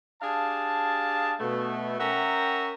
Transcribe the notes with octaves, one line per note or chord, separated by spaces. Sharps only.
D4 G4 G#4 F5 A5
B2 A3 B3
C#4 A#4 E5 F#5 G5 A#5